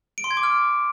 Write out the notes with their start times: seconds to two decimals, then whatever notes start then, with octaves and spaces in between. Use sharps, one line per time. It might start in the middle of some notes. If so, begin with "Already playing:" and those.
0.18 D7
0.24 C6
0.31 G#6
0.37 D6
0.43 F6